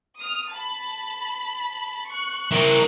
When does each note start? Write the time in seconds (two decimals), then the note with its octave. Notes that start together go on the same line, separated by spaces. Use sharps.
0.18 D#6 F6
0.49 A5 B5
2.07 C#6 F#6
2.51 E4 A#4